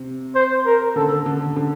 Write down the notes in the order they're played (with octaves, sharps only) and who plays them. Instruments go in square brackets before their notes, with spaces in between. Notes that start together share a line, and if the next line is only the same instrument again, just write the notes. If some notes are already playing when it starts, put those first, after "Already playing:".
Already playing: [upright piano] C3
[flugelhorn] C5
A#4
[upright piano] D3 [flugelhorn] A4
[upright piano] D3
D3